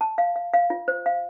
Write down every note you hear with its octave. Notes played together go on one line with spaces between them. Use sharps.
A5
F5
F5
F5
F4
C5
F5